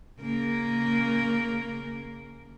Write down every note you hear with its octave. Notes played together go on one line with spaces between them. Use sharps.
C#3 A#3 A#4